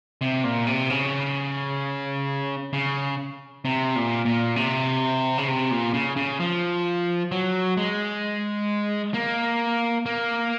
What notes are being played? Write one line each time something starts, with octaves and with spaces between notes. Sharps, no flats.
C3
A#2
C3
C#3
C#3
C3
A#2
A#2
C3
C#3
C3
A#2
C#3
C#3
F3
F#3
G#3
A#3
A#3